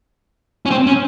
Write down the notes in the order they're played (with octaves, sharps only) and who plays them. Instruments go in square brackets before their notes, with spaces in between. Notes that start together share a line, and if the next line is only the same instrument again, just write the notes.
[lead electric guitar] C#4
C4
C#4